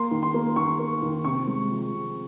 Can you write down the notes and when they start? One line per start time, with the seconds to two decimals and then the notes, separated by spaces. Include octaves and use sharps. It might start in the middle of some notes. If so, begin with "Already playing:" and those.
Already playing: A#3 C6
0.11 D#3
0.23 C6
0.34 A#3
0.56 D#3 C#6
0.79 A#3
1.02 D#3
1.25 C3 C#6
1.47 G#3
1.70 F3
1.92 C3